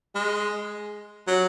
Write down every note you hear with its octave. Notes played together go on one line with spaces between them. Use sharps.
G#3
F#3